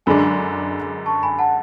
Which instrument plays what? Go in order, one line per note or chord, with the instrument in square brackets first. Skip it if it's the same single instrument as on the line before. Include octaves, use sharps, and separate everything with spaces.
[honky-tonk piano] F#2 D3 G#3 D4 [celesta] G#5 B5
[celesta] A5 C#6
G#5 B5
F#5 A5